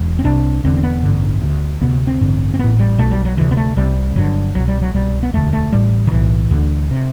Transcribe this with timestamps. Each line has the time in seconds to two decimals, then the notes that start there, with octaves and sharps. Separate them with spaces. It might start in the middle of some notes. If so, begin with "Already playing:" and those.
Already playing: E1
0.19 C4
0.24 C2 C3 D4
0.64 E1 E2 D3 C4
0.77 C4
0.83 B3
1.03 A1 G2 D3
1.42 D2 D3
1.81 D2 C3 B3
2.07 C4
2.21 A1 G2 D3
2.54 C4
2.59 A1 A2 B3
2.79 G3
2.98 B1 B2 A3
3.11 G3
3.25 F#3
3.37 D2 C3 E3
3.51 B3
3.57 A3
3.77 C2 C3 G3
4.16 G1 G2 D3 F#3
4.55 C2 B2 F#3
4.68 G3
4.82 F#3
4.94 C2 B2 G3
5.23 B3
5.34 E1 D2 D3 A3
5.53 A3
5.73 A1 A2 G3
6.07 D3
6.11 B1 A2 E3
6.51 D2 D3
6.91 C3